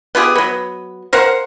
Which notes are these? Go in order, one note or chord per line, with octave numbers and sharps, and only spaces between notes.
B3 F4 G4 G#4
F#3 B3
A#4 C5 F5 F#5